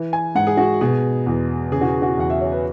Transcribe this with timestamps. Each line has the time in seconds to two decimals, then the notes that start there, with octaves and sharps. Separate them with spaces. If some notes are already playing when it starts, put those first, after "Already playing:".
Already playing: E3
0.13 G#5
0.35 G#2 F#5
0.47 G#4
0.57 F#4
0.81 B2 G#4
1.26 E2
1.72 C#3 G#4
1.81 F#4
2.02 F#4
2.17 E2 F#5
2.30 E5
2.41 C#5
2.52 B4